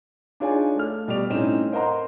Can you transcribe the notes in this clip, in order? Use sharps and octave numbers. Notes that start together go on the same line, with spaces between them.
D4 D#4 F4 G#4 C#5 G#5
A3 F6
B2 G3 D5 F7
A2 C4 C#4 D#4 E7
A#4 C5 D#5 F#5 A#5 C6